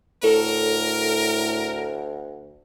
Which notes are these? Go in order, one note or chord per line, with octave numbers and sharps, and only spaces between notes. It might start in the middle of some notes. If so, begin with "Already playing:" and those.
D2 A2 A4 A#4 C#5